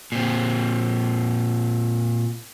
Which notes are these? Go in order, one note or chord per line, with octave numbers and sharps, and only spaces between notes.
A#2 C4